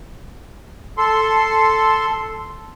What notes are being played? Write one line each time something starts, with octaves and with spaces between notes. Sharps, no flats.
A4 C6